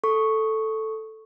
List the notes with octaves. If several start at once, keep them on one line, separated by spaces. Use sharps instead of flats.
A4 C#6